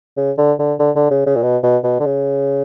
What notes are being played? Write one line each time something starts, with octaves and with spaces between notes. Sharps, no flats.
C#3
D3
D3
D3
D3
C#3
C#3
A#2
B2
B2
B2
D3
C#3